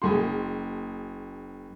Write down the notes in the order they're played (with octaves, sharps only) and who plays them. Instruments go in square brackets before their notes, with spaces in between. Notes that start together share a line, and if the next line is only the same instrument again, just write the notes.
[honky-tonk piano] F#1 G#4 C6